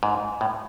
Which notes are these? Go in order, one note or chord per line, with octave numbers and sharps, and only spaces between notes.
G#2
A2